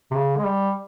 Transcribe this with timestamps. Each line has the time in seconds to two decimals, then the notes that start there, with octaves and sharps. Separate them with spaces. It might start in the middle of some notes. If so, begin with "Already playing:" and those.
0.11 C3
0.16 C#3
0.37 G#3
0.45 G3